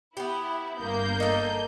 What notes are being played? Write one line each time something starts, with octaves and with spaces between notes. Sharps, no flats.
B3 E4 G4
G1 A#3 G6
D#4 A4